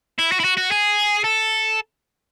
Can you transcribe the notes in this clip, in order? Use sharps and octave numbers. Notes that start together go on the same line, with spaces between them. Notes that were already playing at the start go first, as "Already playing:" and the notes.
E4
F#4
E4
F#4
F#4
G#4
A4